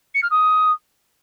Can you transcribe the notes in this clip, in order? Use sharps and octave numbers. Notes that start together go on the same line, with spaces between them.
C#7
F6
D#6